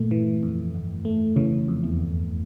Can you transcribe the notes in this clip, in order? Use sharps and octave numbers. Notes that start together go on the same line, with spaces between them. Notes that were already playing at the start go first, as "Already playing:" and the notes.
Already playing: G1 A#2 A3
E3
F2
G1
A3
C#3 E3
F2
E2
G1